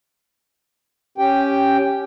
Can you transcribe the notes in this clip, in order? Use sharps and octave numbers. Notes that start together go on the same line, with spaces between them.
C#4 G4 G5